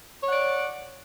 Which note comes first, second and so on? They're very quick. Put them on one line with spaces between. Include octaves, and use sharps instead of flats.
C#5 F#5 D5